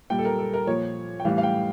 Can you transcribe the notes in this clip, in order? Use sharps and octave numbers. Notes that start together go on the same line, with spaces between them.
A#2 G3 G5
A4
A#4
A4
A#4
A#2 F3 C#5
G5
A2 E3 G3 F5
F5
G5